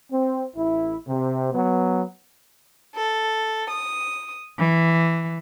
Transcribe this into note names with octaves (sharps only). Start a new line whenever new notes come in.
C4
A1 E4
C3
F#3 B3
A4
D#6
E3